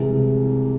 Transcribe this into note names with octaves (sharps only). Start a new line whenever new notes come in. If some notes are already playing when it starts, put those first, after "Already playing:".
Already playing: C2 C3 E3 G#3